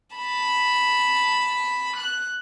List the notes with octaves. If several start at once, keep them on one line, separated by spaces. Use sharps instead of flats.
A5 B5
F#6